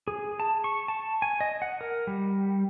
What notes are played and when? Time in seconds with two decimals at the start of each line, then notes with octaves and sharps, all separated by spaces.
0.08 G#4
0.40 A5
0.64 C#6
0.88 A5
1.22 G#5
1.41 D#5
1.62 F#5
1.81 A#4
2.07 G3